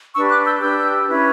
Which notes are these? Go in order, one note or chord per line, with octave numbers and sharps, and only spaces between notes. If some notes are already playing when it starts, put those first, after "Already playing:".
D4 G4 B4 C#6 E6
D6 F#6
E6 G6
D4 G4 B4 E6 G6
C#4 E4 B4